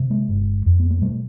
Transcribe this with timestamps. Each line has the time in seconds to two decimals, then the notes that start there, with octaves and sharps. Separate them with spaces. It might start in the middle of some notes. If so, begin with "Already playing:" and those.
Already playing: C3
0.10 G#3 A#3
0.29 G1
0.66 F2
0.80 B3
0.91 A#3
1.02 B2 G3 A3